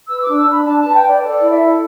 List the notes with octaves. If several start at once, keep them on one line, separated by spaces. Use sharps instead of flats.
B4 E6
D4 D6
E6
D4 B5
D4 A5
B4 A5
G5
B4 D5
A4 D5
E4
E5
A4